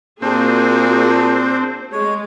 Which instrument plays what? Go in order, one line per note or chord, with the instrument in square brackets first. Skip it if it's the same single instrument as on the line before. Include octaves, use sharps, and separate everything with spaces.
[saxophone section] A#2 [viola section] A#3 F#4 G#4 [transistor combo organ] C4 [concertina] D4
[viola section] G#3 [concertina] C#5